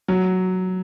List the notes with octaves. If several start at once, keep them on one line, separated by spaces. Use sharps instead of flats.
F#3